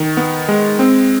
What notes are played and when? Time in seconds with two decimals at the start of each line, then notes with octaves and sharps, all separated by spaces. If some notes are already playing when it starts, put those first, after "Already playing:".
Already playing: D#3
0.17 B3
0.48 G#3
0.79 C4